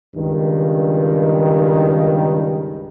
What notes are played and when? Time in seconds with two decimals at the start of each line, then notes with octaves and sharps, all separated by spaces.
0.15 C#2 G2 D#3